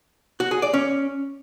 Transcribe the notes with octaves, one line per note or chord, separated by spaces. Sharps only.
F#4
G#4
D5
C#4